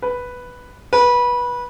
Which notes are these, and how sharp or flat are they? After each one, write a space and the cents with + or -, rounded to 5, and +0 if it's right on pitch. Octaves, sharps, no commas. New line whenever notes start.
B4 +0
B4 -20